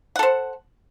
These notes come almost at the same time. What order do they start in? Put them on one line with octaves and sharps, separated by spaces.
F#5 A4 C5